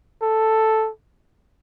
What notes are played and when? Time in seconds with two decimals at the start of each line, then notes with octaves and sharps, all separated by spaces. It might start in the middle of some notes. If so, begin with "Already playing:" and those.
0.22 A4